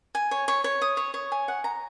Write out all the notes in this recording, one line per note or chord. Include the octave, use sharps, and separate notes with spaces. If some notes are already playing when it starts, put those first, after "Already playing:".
G#5
C#5
C#5
C#5
D#6
C#5
C#5
G#5
F#5
A#5